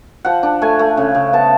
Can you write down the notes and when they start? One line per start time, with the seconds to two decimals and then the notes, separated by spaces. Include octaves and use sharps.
0.25 F3 F#5
0.43 D4
0.62 A3 G#5
0.79 A3
0.97 C#3
1.15 C#3
1.33 B3 A5